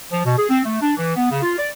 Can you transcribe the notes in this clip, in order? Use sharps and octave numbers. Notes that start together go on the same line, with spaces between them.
F3
B2
G#4
C4
A3
D4
E3
B3
C#3
F4
D5